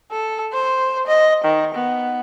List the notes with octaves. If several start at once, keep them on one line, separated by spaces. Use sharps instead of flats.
A4
C5
D#5
D#3
B3